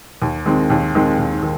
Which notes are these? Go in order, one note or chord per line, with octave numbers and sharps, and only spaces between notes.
D#2
D#3 G#3 C4
D#2
D#3 G#3 C4
D#2
D#3